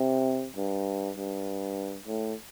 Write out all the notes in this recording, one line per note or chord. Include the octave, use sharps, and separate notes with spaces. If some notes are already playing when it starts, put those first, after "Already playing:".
Already playing: C3
G2
G2
A2